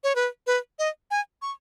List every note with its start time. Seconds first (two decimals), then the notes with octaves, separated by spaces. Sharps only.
0.04 C#5
0.15 B4
0.47 B4
0.79 D#5
1.11 G#5
1.42 C#6